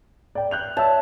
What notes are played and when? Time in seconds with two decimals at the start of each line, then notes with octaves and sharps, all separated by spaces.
0.35 D5 G5
0.51 F#6 G6 F7
0.77 C#5 E5 A5 E6